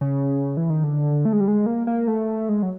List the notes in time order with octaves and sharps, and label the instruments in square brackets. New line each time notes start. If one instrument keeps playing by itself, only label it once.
[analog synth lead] C#3
E3
D#3
D3
A3
G#3
G3
G#3
A#3
A#3
A3
G#3
F#3